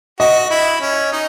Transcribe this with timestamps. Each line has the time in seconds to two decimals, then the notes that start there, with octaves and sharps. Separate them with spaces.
0.20 F#4 D#5
0.51 E4
0.81 C#4
1.12 D#4